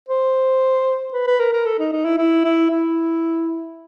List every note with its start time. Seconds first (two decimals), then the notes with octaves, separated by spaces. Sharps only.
0.09 C5
1.13 B4
1.27 B4
1.39 A#4
1.53 A#4
1.66 A4
1.79 D#4
1.93 D#4
2.05 E4
2.18 E4
2.45 E4
2.71 E4